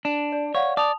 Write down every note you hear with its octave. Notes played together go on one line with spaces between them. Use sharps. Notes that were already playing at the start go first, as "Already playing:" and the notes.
D4
D5
C#5 D5 F5 F#5
D5 A5 D#6 F7